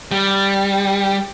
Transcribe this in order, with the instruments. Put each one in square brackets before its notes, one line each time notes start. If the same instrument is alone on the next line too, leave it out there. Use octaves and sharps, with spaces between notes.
[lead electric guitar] G3